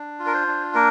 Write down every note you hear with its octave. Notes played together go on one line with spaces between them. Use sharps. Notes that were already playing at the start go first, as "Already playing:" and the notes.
Already playing: D4
F4
A#4
C5
D4
A#3 A#4